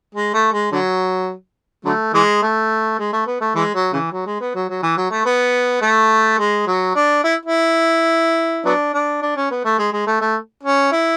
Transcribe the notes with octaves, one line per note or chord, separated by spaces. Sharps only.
G#3
A3
G#3
D3 F#3
D3 F#3 A3
E3 G#3
A3
G#3
A3
B3
A3
E3 G#3
F#3
C#3 E3
F#3
G#3
B3
F#3
F#3
E3
F#3
A3
B3
A3
G#3
F#3
D4
E4
E4
F#3 B3 D4
D4
D4
C#4
B3
A3
G#3
G#3
A3
A3
C#4
E4